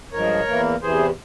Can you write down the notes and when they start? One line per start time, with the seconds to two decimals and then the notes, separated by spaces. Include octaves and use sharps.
0.12 G2 F3 G#3 A#4 C#5
0.48 E2 E3 A#3
0.82 E2 C3 E3 G#4 C5